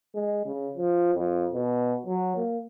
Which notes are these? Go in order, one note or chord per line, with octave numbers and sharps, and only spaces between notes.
G#3
C#3
F3
F2
B2
F#3
A#3